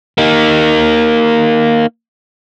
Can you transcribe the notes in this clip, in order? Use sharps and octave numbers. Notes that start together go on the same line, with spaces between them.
A#3 D#4